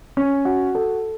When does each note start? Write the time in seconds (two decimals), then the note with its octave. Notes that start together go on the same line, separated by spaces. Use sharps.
0.17 C#4
0.45 F#4
0.75 A4